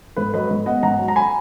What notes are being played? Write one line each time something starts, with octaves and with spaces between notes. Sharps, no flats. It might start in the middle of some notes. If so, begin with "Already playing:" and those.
G#2 B4
F#3 B4 D#5
G#2
B3 D#5 F#5
G#2 F#5 A#5
F#3
A#5
G#5 B5